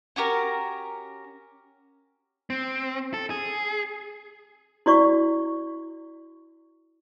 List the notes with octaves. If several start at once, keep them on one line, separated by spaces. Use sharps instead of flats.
C#4 F#4 G4 A#4
C4
A4
G#4
E4 F#4 D5 C#6